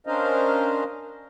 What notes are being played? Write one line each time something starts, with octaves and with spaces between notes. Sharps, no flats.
C#4 D4 A#4 C5 D#5 F5